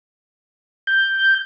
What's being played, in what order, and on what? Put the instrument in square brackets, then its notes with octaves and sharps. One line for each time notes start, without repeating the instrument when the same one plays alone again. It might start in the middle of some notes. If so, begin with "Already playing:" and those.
[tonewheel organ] G6